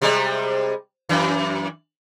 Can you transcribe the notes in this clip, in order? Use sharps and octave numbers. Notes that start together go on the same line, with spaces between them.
C3 G3 G#3
F#2 E3